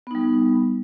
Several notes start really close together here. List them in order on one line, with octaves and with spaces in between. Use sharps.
B3 D#4 G3